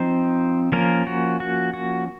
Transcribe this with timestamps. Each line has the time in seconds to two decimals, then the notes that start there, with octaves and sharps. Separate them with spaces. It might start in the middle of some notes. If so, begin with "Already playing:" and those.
Already playing: F3 C4 D#4 C5
0.72 F3 A#3 C#4 A#4
1.07 F#4
1.40 F#4
1.74 F#4